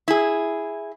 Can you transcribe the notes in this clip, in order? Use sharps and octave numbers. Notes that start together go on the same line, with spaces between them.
E4 G#4